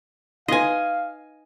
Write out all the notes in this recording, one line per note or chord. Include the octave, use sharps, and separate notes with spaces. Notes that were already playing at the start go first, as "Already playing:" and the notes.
D#4 B4 D#5 F5 G#5